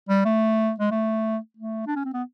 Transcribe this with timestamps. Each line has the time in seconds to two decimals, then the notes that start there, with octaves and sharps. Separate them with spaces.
0.09 G3
0.25 A3
0.80 G#3
0.91 A3
1.57 A3
1.87 D4
1.96 C#4
2.05 C4
2.14 B3